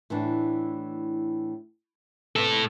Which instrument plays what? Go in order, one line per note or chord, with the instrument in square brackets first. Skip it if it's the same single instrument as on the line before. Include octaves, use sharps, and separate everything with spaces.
[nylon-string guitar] A2 E3 D4
[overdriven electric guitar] A2 A4 [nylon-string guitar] C3 B3